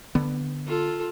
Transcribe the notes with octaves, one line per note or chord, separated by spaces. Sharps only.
D3 B3
F4 A4